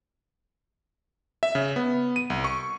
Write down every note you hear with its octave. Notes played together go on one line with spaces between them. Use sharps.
E5
C#3
B3
D#7
C2
C#6